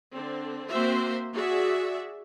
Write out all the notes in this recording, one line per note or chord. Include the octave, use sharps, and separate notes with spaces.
D3 C4
A#3 C4 F#4 C5 E5
F#4 G#4 D5 E5